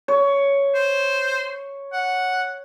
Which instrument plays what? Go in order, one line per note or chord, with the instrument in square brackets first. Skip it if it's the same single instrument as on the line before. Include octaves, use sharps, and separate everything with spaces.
[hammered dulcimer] C#5
[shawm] C5
F#5